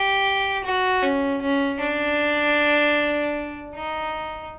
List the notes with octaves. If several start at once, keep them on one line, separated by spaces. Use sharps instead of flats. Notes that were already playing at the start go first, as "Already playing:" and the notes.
Already playing: G4
F#4
C#4
C#4
D4
D#4